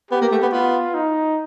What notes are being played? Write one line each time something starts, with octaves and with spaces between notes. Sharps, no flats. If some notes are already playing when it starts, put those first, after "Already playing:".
B3 G4
A#3
A3
B3
B3 F4
D#4